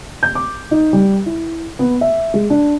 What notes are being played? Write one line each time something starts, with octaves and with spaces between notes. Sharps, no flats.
G6
D6
D#4
G3
E4
B3
E5
G#3
D4